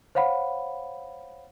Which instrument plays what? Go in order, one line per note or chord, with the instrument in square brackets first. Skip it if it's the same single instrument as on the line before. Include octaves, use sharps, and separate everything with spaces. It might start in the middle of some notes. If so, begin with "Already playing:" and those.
[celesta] C5 C#5 F5 F#5 B5